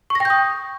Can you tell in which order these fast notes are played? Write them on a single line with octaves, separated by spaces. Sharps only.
C#6 A#6 G5 G6 D#6